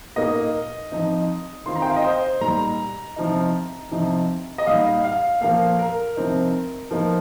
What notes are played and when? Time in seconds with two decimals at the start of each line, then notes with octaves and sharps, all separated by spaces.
0.16 A#2 A#3 D#4 D#5
0.92 F3 C4 D#4
1.66 D#3 C4 F4 C6
1.76 A#5
1.82 G5
1.89 F5
1.96 D#5
2.04 C5
2.41 A#2 G3 D#4 A#5
3.16 C3 F3 D#4
3.92 C3 F3 D#4
4.58 D#5
4.67 A#2 G3 D#4 F5
5.04 F5
5.41 A#2 F3 A#3 F5
5.79 A#4
6.16 C3 F3 C4 D#4
6.91 F3 A#3 D#4